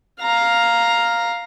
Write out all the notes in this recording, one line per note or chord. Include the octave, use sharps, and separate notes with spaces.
F5 A#5